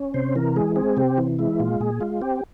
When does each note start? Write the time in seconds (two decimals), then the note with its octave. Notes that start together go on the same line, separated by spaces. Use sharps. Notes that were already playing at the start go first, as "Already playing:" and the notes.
Already playing: C#4
0.14 C3 C5
0.35 E3 A#4
0.56 G#3 G#4
0.76 C4 G#4
0.97 C3 G4
1.18 E3
1.39 G#3 E4
1.60 A#2 F4
1.80 A#2 G#4
2.01 G#3 F4
2.21 C4 G4